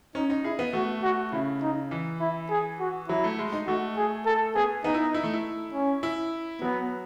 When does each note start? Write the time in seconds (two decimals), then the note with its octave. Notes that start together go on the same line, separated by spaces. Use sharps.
0.15 C#4 D#4
0.30 D#4
0.44 E4 G#4
0.59 B3
0.73 A3 F#4
1.03 F#4
1.32 C#3 E4
1.62 D#4
1.91 E3
2.20 E4
2.50 G#4
2.80 F#4
3.09 F#3 E4
3.24 A3
3.39 G#3
3.52 D#4
3.67 A3 F#4
3.97 G#4
4.26 A4
4.55 B3 G#4
4.84 B3 D#4
4.94 E4
5.14 E4
5.24 A3
5.33 E4
5.73 C#4
6.03 E4
6.62 F#3 B3